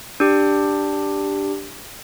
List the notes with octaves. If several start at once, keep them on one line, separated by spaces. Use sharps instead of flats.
D4 G4